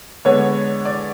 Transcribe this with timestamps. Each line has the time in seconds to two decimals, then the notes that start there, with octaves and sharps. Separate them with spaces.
0.25 D3 G#3 B3 D4 C#5
0.85 D5